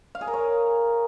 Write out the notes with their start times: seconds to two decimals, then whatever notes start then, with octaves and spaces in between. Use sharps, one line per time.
0.15 F5
0.21 G#4
0.27 A#4
0.34 C#5